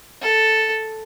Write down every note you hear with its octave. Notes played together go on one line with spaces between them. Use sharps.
A4